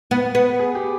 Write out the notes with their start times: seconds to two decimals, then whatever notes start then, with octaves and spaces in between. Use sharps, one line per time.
0.11 B3
0.35 B3
0.59 G#4
0.75 G4